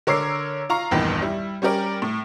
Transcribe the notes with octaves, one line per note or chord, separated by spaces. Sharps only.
D3 A#4 C#5 D6 E6 C7
F4 F5 A#5 C#6
A1 E2 G2 A#2 D#3 B4
G3 E4
G3 C#4 G4 A#4 D5
A2